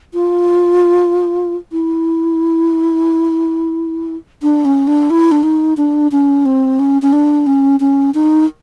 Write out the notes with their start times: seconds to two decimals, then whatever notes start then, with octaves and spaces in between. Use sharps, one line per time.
0.13 F4
1.72 E4
4.42 D4
4.65 C#4
4.87 D4
5.10 E4
5.31 D4
5.43 D#4
5.77 D4
6.12 C#4
6.45 C4
6.79 C#4
7.02 C#4
7.13 D4
7.46 C#4
7.80 C#4
8.14 D#4